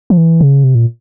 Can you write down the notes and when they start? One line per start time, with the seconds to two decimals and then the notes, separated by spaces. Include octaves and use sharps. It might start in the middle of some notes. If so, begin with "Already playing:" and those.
0.10 F3
0.17 E3
0.41 C#3
0.64 C3
0.75 A#2